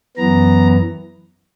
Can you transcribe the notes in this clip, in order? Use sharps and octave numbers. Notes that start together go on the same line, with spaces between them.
F#2 E3 B3 A#5